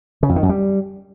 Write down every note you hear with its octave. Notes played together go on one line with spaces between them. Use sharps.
C#3
F2
D#3
F#2
G3